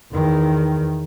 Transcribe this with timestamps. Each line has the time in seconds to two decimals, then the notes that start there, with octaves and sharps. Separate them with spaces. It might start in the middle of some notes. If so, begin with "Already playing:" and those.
0.12 E2 D#3